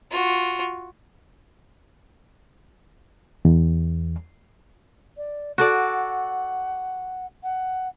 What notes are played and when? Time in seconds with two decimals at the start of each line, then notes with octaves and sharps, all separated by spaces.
0.11 F4 F#4
3.45 E2
5.17 D5
5.58 F#4 A4 D5 F#5
7.43 F#5